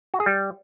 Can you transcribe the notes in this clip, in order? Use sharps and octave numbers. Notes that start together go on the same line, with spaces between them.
F#4
G#4
G3